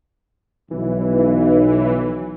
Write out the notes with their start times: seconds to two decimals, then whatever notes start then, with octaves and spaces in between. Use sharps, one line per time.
0.71 B1 E3